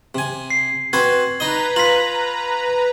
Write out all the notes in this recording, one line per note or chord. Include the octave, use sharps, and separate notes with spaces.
C3 G#5
C7
C4 F#4 B4 G#6
D#4 B4 D#5 A#5
F4 B6 F#7